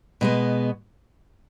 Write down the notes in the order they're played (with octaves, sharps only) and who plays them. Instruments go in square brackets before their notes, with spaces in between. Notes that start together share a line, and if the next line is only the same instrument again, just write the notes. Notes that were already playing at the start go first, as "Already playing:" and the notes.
[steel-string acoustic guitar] B2 G#3 B3